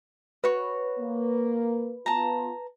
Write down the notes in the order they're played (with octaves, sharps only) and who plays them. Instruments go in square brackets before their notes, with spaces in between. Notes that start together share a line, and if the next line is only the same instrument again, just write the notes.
[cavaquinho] F#4 C#5 [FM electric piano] B4
[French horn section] A#3
[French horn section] B3 F4 [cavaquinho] A5 A#5